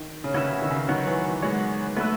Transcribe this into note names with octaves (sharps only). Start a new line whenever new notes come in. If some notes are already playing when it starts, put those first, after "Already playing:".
Already playing: D#3
C#3
D#3 C#4 F#4 B4 E5
C#3
D#3
C#3
D#3 F#3 B3 F#4 C#5
E3
E3
F#3 G#3 B3 F#4 C#5
A3 B3 F#4 B4 E5